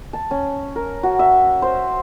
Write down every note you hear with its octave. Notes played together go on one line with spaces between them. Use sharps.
A5
C#4
A#4
F#4
E5
C5